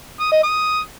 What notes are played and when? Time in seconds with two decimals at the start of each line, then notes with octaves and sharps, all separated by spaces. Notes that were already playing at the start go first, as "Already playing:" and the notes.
0.20 D#6
0.32 D#5
0.43 D#6